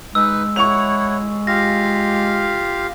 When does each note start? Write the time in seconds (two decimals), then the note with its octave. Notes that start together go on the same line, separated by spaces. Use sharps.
0.15 G#3 D#4 B4 E6
0.56 E4 C#5 F#5 C#6 F7
1.47 F4 G4 F5 A#6